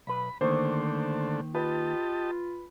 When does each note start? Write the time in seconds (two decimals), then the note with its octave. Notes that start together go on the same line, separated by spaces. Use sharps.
0.07 B1 B4 B5
0.41 D3 D#3 A3 A#3 C5
1.55 F4 G4 B4 D#5 A5